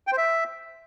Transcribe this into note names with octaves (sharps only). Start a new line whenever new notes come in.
G5
C5
E5